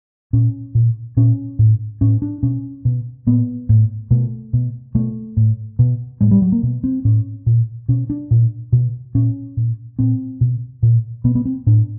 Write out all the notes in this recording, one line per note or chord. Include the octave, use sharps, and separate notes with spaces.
A#2 C#4
A#2
A#2 C#4
A2
A2 C#4
D4
B2 C#4
B2
A#2 B3
A2
B2 A3
B2
B2 A3
A2
B2
A2 G#3
G3
F#3
A#3
B2
C4
A2 C#4
A#2
B2 C#4
D4
A#2
B2
A#2 C#4
A#2
A#2 C4
B2
A#2
B2 B3
B3
C4
A2 D4